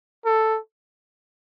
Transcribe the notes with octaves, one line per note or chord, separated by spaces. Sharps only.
A4